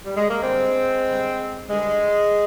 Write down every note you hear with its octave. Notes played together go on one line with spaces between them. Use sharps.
G3
G#3
A#3
G2 D3 G3 G#3 C4
G2 D3 G3
G2 D3 G3 G#3